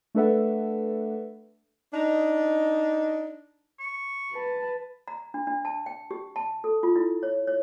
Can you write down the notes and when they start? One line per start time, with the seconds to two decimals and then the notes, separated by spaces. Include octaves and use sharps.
0.15 A3 D4 A4 B4 E5 F#5
1.94 D4 D#4
3.80 C#6
4.31 B4 A5
5.08 A#5
5.34 D4
5.47 D4
5.65 A5
5.86 G5
6.11 G4
6.36 A5
6.64 A4
6.83 F4
6.96 E4
7.23 C#5
7.47 C#5